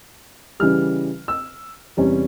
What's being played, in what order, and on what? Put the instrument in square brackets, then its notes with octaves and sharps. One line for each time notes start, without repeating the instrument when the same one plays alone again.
[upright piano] C#3 E3 G3 F6
E6
E2 C3 G3 C#4